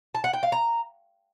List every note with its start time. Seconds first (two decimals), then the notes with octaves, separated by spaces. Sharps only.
0.15 A5
0.24 F#5
0.33 G5
0.43 F5
0.52 A#5